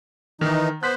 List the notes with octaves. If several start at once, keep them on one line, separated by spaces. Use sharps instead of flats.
D#3 E3 D#4
B3 C5 F#6 B6